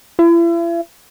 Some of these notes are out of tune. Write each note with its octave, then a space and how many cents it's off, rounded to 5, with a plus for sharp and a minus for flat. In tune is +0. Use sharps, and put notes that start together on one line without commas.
E4 +40